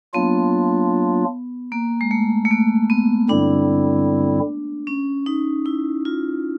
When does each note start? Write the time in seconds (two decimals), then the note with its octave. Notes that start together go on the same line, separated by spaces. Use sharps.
0.14 F#3 A#3 B3 D4 F4
1.72 A#3
2.01 G#3
2.11 A3
2.45 A3
2.51 A#3
2.90 B3
3.29 G2 D3 G3 C4 D4 E4
4.87 C#4
5.26 D#4
5.66 E4
6.05 F4